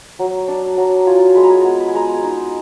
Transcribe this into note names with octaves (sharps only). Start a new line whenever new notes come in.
F#3 A#5
D4
F#3 A#5
F4 G#5
G#3 B5
A#5
G#5
B3 G#5
B5
G#5
G#3 A#5
G#5
D#4